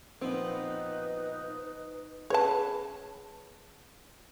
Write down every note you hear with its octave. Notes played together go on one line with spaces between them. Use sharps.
A#2 F3 B3 C4 D#4 B4
G#4 B4 C#5 A5